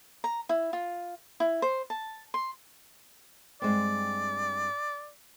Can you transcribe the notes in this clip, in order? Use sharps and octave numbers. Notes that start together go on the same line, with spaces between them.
A#5
E4
F4
E4
C5
A5
C6
G2 G#3 C4 D5